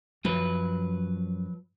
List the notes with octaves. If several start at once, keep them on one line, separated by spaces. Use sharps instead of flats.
F#2 F3 F#3 B4